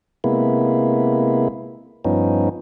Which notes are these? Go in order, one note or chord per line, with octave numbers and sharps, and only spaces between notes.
C3 G#3 A#3 B3 E4
G2 F3 B3 C#4 D#4